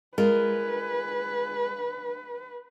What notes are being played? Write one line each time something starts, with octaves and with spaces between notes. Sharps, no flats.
G#3 F4 A#4 B4